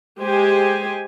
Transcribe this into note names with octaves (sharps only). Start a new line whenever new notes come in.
G#3 G4 C5 G#5